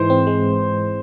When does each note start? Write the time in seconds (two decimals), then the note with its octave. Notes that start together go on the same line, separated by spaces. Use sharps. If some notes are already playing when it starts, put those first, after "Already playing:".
Already playing: G#2 E3 G#3 C5
0.10 C4
0.27 G#3